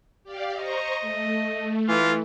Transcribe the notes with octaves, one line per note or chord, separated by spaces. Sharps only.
G4 D5 F5
C5 D#5 A#5 C#6
A3
E3 F4